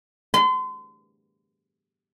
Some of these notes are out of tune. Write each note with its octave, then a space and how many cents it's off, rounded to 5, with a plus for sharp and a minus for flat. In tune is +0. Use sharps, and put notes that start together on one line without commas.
C6 -35